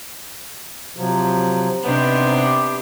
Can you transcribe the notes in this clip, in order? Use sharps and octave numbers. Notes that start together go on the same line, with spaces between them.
C3 F3 F#3
C3 B3 D4 D#4 C5
G4